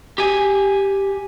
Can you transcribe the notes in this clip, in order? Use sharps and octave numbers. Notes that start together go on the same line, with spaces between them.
G4 G#5